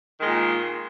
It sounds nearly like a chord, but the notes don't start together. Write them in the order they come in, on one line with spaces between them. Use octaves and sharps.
D#3 G#3 A#2